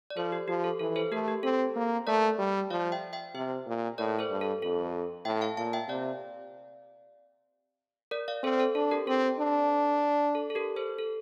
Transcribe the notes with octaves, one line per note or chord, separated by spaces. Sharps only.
D5
F3 A4 C5
G4
F3 G4
A4
E3 A4
A4 C5
A3 G4 A#4
G4
C4 A4
A#3
A3 A#4 D5
G3
F3 D5 F5
E5 G5
E5 G5
C3 C5 E5
A#2
A2 A#4 D5
A4 C5
G2
A4
F2 A4
A2 E5 G5
F5 A5
A#2 F5 A5
E5 G5
C3 D5 F5
A#4 D5
D5 F5
C4 A4 C5
A4
D4 A4
G4 A#4
C4 A4
D4
A4
A4
G4 A#4
A4 C5
A4